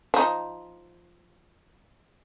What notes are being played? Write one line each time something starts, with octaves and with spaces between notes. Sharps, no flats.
F3 D#4